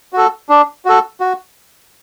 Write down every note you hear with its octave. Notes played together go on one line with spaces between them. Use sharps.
F#4 A4
D4
F#4 A4
F#4